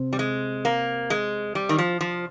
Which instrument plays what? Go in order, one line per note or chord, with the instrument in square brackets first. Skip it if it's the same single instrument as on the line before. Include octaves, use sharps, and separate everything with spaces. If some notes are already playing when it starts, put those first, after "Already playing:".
Already playing: [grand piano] C3 C4
[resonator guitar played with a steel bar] G3
G#3
A#3
G#3
G3
D#3
F3
F3